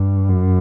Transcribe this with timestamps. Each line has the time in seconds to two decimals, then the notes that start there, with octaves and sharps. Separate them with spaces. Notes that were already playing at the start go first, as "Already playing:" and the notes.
Already playing: G2
0.28 F#2